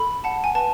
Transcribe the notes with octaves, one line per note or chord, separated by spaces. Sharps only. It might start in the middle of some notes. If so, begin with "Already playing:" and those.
Already playing: A4 B5
F#5 A5
G#5
B4 A5